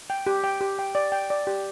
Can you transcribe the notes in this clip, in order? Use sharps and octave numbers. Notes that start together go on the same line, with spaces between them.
G5
G4
G5
G4
G5
D5
G5
D5
G4